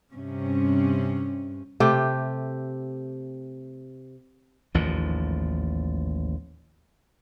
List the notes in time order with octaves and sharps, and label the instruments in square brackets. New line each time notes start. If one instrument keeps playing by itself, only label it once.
[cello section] G2 C3 C#4
[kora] C3 A3 G4
[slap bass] A1 D#2 G#2 F3